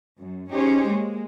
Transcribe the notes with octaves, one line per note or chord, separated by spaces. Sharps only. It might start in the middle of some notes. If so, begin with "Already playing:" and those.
F#2
C#4 D#4 G4 G#4 C5 C#5
G#3 A#3